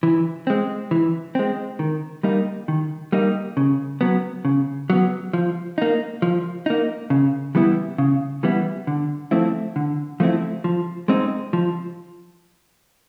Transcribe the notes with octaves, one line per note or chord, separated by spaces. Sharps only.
E3
G#3 C4
E3
G#3 C4
D#3
G3 A#3 D#4
D#3
G3 A#3 D#4
C#3
F#3 B3
C#3
F#3 B3
F3
A#3 D#4
F3
A#3 D#4
C#3
E3 G3 B3 E4
C#3
E3 G3 B3 E4
D3
F3 A3 C4 E4
D3
F3 A3 C4 E4
F3
G#3 C4 D#4
F3